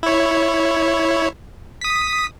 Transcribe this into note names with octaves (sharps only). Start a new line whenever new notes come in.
E4 C#5
D#6 B6